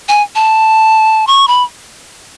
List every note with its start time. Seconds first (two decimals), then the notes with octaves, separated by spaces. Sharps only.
0.09 G#5
0.35 A5
1.27 C#6
1.48 B5